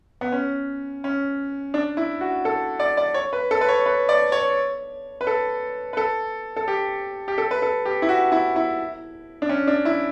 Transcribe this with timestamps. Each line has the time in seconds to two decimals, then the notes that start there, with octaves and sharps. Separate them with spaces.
0.21 B3
0.32 C#4
1.04 C#4
1.74 D4
1.97 E4
2.21 F#4
2.45 A4
2.80 D5
2.97 D5
3.14 C#5
3.33 B4
3.51 A4
3.61 B4
3.69 C#5
3.86 B4
4.09 D5
4.32 C#5
5.21 B4
5.27 A4
5.93 B4
5.97 A4
6.57 A4
6.68 G4
7.28 G4
7.38 A4
7.51 B4
7.62 A4
7.85 G4
8.02 E4
8.09 F#4
8.32 E4
8.56 E4
9.42 D4
9.49 C#4
9.68 D4
9.85 E4